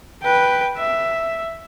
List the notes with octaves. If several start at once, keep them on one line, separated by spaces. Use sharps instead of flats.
B4 G5
E5